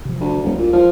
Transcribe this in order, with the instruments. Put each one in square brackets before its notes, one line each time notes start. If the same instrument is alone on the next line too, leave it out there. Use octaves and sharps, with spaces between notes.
[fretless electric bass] C3 F3
[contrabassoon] D2
[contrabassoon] E1 [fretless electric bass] C#2 G3
[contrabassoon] A#2
F3